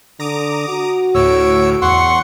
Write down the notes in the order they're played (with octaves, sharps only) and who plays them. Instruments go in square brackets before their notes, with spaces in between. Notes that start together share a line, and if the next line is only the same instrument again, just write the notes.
[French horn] D3 [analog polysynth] A#5 D6 D#6
[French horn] F#4
[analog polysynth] D2 A2 D7 [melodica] C#5 E6
[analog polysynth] E2 [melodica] F#5 C6 C#6